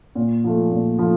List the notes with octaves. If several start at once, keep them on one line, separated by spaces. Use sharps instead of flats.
A#2
F3 A3
A#2
F3 A3